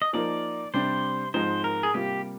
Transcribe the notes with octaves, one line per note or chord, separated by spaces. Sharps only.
D#5
F3 A#3 D#4 A#4 D5
C3 G3 D4 C5
G#2 F3 G#3 C4 D#4 C5
A#4
G#4
C3 G3 A#3 F4 G4